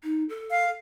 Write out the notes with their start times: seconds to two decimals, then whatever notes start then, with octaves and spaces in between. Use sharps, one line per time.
0.03 D#4
0.29 A4
0.50 F5